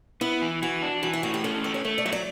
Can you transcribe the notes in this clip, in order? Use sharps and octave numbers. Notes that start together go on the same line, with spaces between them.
B3 E4
E3
E3 F#4
D4
E3 F#4
E4
A2 F#4
G4
C#4 A4
A3 D5
C#5
A3 C#5
D5
F#3 E5
D5